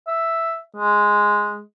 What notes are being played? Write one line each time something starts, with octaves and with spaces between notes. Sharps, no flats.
E5
G#3